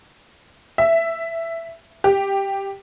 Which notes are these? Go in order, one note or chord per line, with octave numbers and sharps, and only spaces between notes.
E5
G4